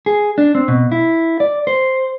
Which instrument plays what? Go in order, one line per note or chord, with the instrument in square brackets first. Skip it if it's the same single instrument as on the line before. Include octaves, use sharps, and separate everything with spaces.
[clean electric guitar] G#4
D4
C4
B2
E4
D5
C5